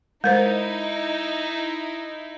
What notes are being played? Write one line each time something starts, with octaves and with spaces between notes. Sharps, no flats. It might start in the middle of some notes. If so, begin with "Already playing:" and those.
G#3 D#4 E4 A#4 C5